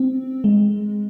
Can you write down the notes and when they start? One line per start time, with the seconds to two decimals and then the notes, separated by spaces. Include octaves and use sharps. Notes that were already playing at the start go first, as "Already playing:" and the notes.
Already playing: C4
0.44 G#3